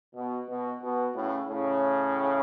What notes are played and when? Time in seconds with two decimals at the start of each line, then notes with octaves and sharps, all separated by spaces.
0.15 B2
0.48 B2
0.82 B2
1.15 A2 C#3
1.48 A2 C#3